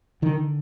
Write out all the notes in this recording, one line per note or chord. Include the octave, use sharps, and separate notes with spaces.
D3 D#3